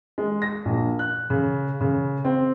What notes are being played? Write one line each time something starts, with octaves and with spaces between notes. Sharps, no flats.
G#3
A#6
A#1
F#6
C#3
C#3
C4